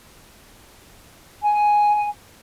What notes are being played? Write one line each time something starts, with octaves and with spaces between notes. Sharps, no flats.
G#5